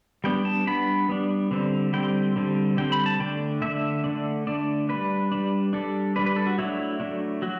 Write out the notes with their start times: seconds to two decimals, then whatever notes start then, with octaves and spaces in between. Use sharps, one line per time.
0.24 G3 B3 D4 G5
0.45 A5
0.67 G3 B3 D4 B5
1.09 G3 B3 D4
1.51 D3 G3 C4
1.93 D3 G3 C4 G5
2.36 D3 G3 C4
2.77 D3 G3 C4 G5
2.92 B5
3.06 A5
3.19 D3 A3 D4 G5
3.62 D3 A3 D4 E5
4.04 D3 A3 D4
4.47 D3 A3 D4 D5
4.89 G3 D4 B4
5.32 G3 D4
5.73 G3 D4 A4
6.16 G3 D4 B4
6.26 B4
6.36 A4
6.47 F#4
6.58 F#3 A3 D4 E4
7.00 F#3 A3 D4
7.42 F#3 F#4